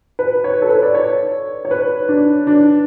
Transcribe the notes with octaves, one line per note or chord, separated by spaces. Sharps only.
B4
C#5
A4
B4
D5
C#5
C#5
B4
D4
D4